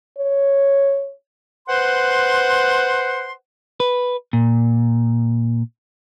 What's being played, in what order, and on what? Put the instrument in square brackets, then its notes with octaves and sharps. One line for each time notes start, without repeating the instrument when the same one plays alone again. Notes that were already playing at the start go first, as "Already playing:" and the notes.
[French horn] C#5
[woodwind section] B4 C5 F#5 C6
[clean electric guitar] B4
A#2